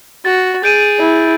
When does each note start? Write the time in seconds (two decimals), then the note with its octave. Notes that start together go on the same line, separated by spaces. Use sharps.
0.25 F#4 A6
0.64 G#4 G6 D7 D#7
0.99 E4